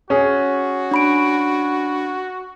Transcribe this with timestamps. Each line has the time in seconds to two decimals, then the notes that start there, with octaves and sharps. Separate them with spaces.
0.10 C#4 F#4 G#4
0.91 D4 B5 D7